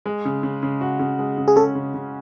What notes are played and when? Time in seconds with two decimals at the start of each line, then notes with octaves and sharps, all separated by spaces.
0.06 G#3
0.25 C#3
0.43 C#3
0.63 C#3
0.81 F#4
0.99 C#3
1.19 G#3
1.38 C#3
1.48 G#4
1.56 C#4 A4
1.75 C#3
1.94 C#3